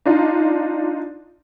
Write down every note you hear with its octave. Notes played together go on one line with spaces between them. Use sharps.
D4 D#4 F4